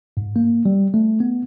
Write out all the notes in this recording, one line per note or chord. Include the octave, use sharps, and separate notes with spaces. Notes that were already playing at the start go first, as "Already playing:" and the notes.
G#2
A#3
G3
A3
B3